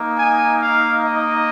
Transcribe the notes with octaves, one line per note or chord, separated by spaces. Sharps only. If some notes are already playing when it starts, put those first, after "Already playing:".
Already playing: A#3 D#4
G#5
F5
D#5